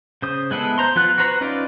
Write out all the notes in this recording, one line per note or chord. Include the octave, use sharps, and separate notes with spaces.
C#3 C5 D#6
G#3 B3 E4 G#4 A4
C5 A#5 C6
F3 B3 F4 F#6
F#4 B4 C5 A#5
C#4 D#4 F4 B4 D5